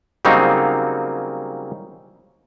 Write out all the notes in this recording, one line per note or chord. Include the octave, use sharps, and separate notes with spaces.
C#3 F#3 G3 A#3 C4 D#4